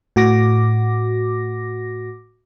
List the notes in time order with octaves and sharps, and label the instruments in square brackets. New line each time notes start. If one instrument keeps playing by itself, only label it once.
[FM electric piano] A2 F#4 D6 A#6